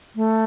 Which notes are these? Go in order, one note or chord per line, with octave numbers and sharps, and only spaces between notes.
A3